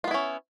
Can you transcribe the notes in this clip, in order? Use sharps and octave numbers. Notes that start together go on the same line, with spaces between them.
B3 C#4 E4 F4